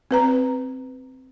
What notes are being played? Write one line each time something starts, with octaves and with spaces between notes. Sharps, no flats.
C4 B4 A#5